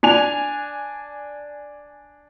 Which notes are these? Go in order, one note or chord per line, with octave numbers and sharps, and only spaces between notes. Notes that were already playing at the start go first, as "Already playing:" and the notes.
D4 G#5 F7